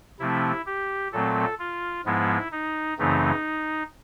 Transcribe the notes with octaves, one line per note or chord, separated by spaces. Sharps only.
C3 F3 A3 C4 E4
G4
A#2 F#3 A3 C4 A4
F4
G#2 F3 G#3 B3 E4
D#4
F#2 C#3 E3 A3 C4 D#4